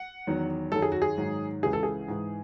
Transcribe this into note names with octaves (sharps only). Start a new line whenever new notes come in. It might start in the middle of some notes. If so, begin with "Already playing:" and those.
Already playing: F#5
E2 D#3 F#3
F#2 D#3 F#3 A4
G#4
F#4
G#4
G#2 D#3 F#3
C#2 C#3 E3 G#4
A4
G#4
G#2 E3